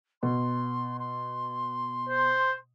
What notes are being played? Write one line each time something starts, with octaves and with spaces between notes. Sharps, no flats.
B2 C6
C6
C5